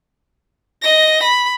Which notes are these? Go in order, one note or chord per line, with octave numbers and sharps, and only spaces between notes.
D#5 A#6
B5